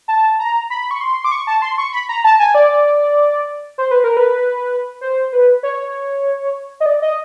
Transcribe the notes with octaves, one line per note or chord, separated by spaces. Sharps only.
A5
A#5
B5
C#6
C6
D6
C#6
A5
C6
C#6
B5
A#5
A5
G#5
D5
C5
B4
A#4
B4
C5
B4
C#5
D#5
D5
D#5